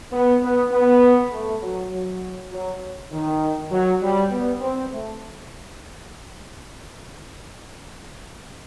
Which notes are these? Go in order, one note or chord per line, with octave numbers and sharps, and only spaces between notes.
B3
B3
B3
A3
F#3
F#3
F#3
D#3
F#3
G3
B3
C4
A3